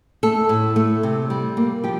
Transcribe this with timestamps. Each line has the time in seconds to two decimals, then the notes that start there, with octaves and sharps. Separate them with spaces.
0.23 A3 A4
0.49 A2
0.76 A3
1.03 C3
1.30 G3
1.57 A#3
1.84 F3 G4